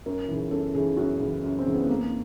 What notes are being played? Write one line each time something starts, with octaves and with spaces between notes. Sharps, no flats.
F#2 A#4
C#3 E3
F#2 A4
C#3 E3 G#4
F#2 F#4
C#3 E3
F#2
C4
C#3 E3
B3
A3
F2 A#3